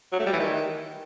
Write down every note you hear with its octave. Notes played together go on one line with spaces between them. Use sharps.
F#3
A3
G3
E3
D#3